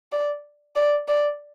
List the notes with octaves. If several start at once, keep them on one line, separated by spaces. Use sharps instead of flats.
D5
D5
D5